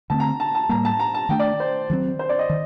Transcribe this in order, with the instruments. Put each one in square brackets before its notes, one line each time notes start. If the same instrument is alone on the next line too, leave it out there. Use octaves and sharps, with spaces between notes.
[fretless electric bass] D3 A3 C4 [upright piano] A5
[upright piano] A#5
A5
A5
[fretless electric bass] A2 G3 A#3 [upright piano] A#5
[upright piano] A5
A#5
A5
[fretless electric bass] D#3 A3 D4 [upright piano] G5
[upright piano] D5
C5
[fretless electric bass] D#3 F#3 C4
[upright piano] C5
D5
D#5
[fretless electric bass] D#3